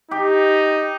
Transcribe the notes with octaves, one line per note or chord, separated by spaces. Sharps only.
D#4 G4